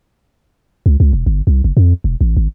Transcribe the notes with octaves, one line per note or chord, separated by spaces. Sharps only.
C#2
C#2
E1
G1
C2
F#1
F2
E1
A1
G#1